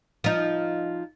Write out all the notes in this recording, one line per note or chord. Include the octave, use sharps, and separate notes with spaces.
F3 D#4